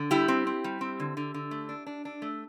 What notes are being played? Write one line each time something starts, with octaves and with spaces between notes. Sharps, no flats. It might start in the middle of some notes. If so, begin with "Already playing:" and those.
Already playing: D3
G3 E4 G4
C4
C4
G3
C4
D3
D3
D3
A3
D4
D4
D4
A3